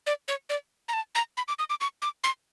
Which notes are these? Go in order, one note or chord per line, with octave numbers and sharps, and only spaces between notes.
D5
C#5
D5
A#5
A5
A#5
B5
D6
D#6
D6
C#6
D6
C6